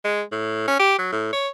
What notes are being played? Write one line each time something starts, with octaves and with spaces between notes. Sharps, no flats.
G#3
A2
C#4
G4
F#3
A2
C#5